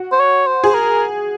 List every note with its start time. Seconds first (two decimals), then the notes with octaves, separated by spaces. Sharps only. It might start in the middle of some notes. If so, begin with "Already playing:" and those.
Already playing: F#4
0.12 C5
0.20 C#5
0.47 C5
0.64 G#4
0.74 A#4